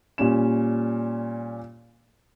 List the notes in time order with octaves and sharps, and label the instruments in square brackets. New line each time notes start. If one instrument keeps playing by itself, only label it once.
[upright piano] A#2 G3 C#4 E7